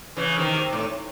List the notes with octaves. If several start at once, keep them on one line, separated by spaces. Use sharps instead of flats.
C#3 E3
C3 D#3
C3
A2